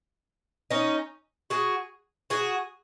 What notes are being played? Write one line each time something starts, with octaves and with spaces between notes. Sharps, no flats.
C#4 D#4
F#4 G#4
F#4 G#4